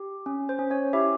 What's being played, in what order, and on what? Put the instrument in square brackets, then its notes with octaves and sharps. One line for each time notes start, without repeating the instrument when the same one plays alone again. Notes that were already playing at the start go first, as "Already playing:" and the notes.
Already playing: [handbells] G4
C#4
C5
C#4
C#4 C#5
E4 G4 E5